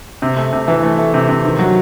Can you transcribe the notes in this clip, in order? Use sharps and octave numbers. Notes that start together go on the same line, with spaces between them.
C3
A3
C3
E3
A3
A3
C3
C3
D#3
F#3